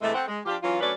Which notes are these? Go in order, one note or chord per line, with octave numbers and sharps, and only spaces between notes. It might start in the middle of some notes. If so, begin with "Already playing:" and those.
G2 C3 E3 G#3 A3
A3 C4 F#5
G#3
F3 D4 F4 G4
E3 F#3 C#4 F4
F#3 A3 C#4 D4 B4 D5